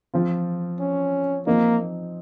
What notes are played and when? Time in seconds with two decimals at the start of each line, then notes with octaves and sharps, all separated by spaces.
0.14 F3 C4 F4
0.80 C#4
1.47 F3 A#3 C4 D#4